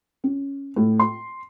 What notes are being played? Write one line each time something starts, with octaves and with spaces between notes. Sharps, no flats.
C#4
A2
C6